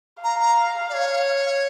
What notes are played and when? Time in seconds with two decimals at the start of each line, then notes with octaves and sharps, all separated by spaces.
0.23 F5 A#5
0.40 A#5
0.89 D5
0.94 C#5